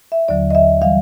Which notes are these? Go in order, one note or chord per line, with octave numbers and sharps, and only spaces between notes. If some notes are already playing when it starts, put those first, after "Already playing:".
E5
D#2 D3 F#3 D5
D#5
E5
E3 G3 F5